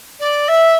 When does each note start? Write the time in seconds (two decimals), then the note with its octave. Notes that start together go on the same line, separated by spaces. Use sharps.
0.19 D5
0.48 E5